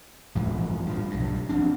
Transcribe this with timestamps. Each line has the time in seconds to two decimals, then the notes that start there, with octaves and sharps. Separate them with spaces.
0.35 A1 G2 E3 F3
0.86 G2 A#2 F3
1.10 B1 G2
1.49 F3 C4 D4